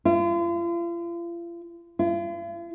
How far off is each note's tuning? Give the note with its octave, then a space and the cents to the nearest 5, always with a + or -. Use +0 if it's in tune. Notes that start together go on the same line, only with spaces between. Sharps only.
F4 -40
F4 -45